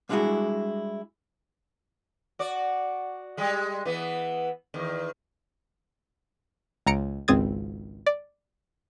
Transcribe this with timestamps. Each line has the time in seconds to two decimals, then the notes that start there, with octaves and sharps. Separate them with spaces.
0.09 G3 G#3 D4 E4 F#4 G#4
2.39 F#4 D5
3.37 G3 G#3
3.85 E3 B3
4.74 E2 D#3
6.86 C#2 A#5 C#7 D7
7.28 G#1 C#2 C4 D#6 G#6 A6
8.06 D5